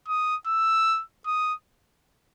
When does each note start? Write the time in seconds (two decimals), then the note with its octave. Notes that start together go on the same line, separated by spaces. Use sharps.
0.08 D#6
0.47 E6
1.27 D#6